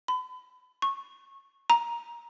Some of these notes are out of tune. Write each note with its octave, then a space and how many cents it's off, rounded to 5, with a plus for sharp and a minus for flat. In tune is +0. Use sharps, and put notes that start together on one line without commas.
B5 +40
C#6 -20
A#5 +15